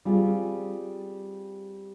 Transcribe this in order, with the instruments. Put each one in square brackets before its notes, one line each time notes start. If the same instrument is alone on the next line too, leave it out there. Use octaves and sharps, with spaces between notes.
[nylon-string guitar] G3 C4 F4 G#4